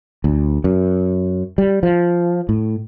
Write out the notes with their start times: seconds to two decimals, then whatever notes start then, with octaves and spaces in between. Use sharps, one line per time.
0.24 D2
0.64 F#2
1.58 G3
1.83 F3
2.49 A2